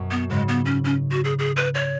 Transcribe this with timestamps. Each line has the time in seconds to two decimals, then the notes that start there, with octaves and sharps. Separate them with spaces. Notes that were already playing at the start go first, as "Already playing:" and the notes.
Already playing: F#2 B2
0.11 B3
0.30 G#2 C#3 G#3
0.48 B3
0.65 C#4
0.84 C#4
1.11 F#4
1.24 G#4
1.39 G#4
1.56 B4
1.75 C#5